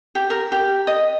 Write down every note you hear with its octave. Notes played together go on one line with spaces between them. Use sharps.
G4
A#4
G4
D#5